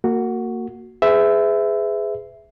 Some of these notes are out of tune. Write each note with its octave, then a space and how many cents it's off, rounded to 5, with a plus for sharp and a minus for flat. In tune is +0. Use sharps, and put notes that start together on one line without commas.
A#3 -25 F#4 +0
G#4 +0 B4 +35 E5 +0